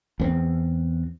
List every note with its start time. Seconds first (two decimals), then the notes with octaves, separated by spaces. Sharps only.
0.20 E2 B3 C4